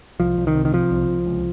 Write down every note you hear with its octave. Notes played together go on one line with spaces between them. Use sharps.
C2 F3
C2
D#3
C3
D#3
C3 F3
C2
C2
C#2